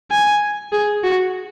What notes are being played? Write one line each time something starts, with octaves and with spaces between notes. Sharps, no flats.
G#5
G#4
F#4